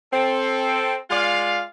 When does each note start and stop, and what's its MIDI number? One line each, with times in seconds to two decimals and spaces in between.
0.13 0.95 60
0.13 0.95 69
1.11 1.62 56
1.11 1.62 65
1.11 1.62 74
1.11 1.62 77